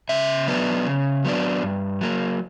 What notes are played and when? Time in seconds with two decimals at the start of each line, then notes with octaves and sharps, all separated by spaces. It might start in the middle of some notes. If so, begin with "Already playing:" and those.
0.09 C#3 E5
0.48 F#3 B3 D4
0.86 C#3
1.25 F#3 B3 D4
1.62 G2
2.01 F#3 A#3